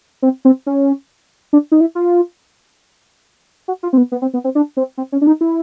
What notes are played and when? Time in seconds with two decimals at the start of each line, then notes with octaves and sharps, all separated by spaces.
0.22 C4
0.45 C4
0.67 C#4
1.53 D4
1.72 D#4
1.81 E4
1.95 F4
3.68 F#4
3.83 F4
3.93 C4
3.97 B3
4.12 B3
4.22 C4
4.34 B3
4.44 C4
4.55 D4
4.77 C4
4.98 C4
5.12 C#4
5.21 D4
5.27 D#4
5.41 E4